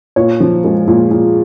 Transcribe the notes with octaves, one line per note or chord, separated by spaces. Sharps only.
A#2 C#5
F3
G#3
A#2
A#2